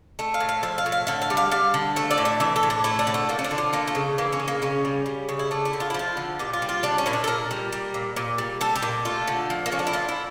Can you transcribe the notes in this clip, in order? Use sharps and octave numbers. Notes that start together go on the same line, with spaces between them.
A3 E5
F5
A2
F5
F3 E5
F5
A2
F5
D3 E5
F5
G3
F5
G3 F5
D3
A3 E5
D5
A2
E5
E3 E5
A4
A2
D4
A3 E4
D4
D3
A3
F3 A#3
C#4
D4
D3
F4
A3 A#3
A3
C#3
E3 A#3
C#4
C#3
A#3
C#3 C#4
G3
G3
C#3
E4
A3 D4
E4
D3
F4
E4
F3 F4
D3
A#2 G4
F4
G3
F4
G3 D4
C#4
A#2 E4
D4
A4
A#2 A#4
G3
G3
A#2
A#2
G3
G3 A4
G4
A#2
A3 F4
D3
F3
A#3
D3 C#4
D4
E4
A#2 F4
E4